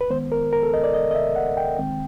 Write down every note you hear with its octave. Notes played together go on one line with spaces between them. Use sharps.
B4
D#3 G#3 B3 C5
A#4
A#4
A4
D#5
D5
D#5
D#5
E5
F#5
G5
D#3 G#3 C4